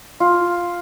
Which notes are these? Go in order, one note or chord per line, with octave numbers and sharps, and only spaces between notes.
F4